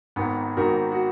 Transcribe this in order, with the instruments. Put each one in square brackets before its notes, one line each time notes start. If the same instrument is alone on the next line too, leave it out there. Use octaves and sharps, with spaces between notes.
[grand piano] G#1 G#2 D#3 B3
G#1 G#2 D#3 F#4 A#4
F#4